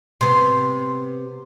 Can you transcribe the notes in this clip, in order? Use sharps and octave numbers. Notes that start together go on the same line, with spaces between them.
C3 B3 C6